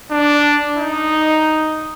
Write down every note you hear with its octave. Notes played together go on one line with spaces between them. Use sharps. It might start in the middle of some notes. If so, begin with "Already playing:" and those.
D4
D#4